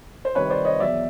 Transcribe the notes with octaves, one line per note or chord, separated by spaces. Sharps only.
C5
C2 C3 D#3 B4 C#5
C5 D5
C#5 D#5
E2 B2 F#3 D5 E5